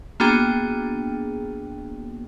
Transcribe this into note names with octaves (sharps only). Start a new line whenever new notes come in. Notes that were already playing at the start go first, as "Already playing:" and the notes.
A#3 B3 D4 F#4 G#4 G5